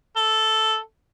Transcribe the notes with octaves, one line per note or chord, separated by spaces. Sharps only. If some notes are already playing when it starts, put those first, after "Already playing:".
A4